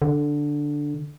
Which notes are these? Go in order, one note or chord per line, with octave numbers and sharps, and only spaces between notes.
D3